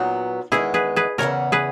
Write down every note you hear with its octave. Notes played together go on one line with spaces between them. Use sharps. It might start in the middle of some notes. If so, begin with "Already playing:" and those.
Already playing: A#2 F#3 B3 D#4 F#4
E2 D#3 G#3 B3 E4 G#4
G#4 B4
G#4 B4
E2 C#3 E3 B3 A#4 C#5
G#4 B4